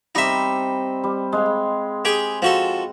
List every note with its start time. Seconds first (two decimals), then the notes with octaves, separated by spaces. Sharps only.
0.15 G3 C4 D#4 E5
1.04 G3
1.32 G#3 F5 G5
2.05 G4 G#4
2.42 F3 F#4 A4